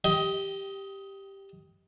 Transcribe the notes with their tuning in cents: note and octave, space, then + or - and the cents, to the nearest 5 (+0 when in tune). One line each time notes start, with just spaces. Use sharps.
G4 +0 D#5 +20 G5 -15